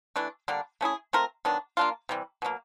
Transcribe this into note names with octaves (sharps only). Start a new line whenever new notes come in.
E3 A3 D4
D3 G3 A#3 D4
A3 C#4 E4 G#4
A3 C4 F4 A#4
D#3 F#3 B3 D4
A#3 D4 F4
C3 E3 G3
B2 F#3 A#3